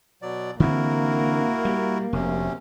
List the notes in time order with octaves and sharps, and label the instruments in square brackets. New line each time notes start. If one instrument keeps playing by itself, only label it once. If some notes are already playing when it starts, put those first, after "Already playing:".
[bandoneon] B2 F#3 D5
[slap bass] D3 E3 C4 [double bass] A#3 [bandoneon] E4 F#4 A#4
[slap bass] G3
[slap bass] F1 [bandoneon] D2 C3 C#4